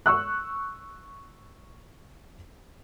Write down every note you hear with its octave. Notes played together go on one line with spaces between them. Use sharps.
C#6 E6 F#6